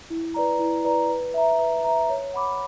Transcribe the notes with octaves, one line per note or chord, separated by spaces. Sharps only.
E4
B4 D5 A#5
E4
B4 D5 A#5
B4
E5 A#5
B4
E5 A#5
C#5
F#5 B5 D6